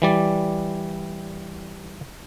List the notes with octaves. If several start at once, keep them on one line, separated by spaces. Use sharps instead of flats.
E3 G3 D5